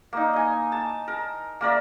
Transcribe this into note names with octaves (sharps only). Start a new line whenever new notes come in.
A#3 D#4
D#5 G#5
A5
A#4
A#3 A#4 D5 E5